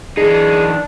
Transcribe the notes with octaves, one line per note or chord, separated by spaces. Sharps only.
E3 D4 D#4 G#4